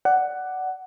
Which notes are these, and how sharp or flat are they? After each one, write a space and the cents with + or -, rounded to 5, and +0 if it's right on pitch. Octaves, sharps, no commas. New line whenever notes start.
D5 +5 F#5 +10